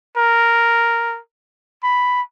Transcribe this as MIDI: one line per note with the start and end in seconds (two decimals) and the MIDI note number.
0.17 1.19 70
1.84 2.22 83